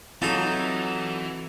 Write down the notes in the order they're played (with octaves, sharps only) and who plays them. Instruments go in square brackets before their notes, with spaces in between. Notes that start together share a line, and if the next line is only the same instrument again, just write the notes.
[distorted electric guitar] E3 [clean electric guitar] F#3 D#4 [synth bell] C4 A6 [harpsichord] F4 A4